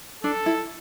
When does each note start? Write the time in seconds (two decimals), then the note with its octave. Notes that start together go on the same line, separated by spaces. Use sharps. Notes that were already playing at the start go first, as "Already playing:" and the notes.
0.24 D4 A4
0.46 E4